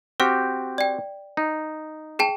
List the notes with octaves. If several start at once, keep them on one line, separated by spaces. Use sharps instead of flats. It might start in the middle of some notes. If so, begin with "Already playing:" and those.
C4 F#4 G4 D6 F6
D5 G5
D#4
G#4 G5 A5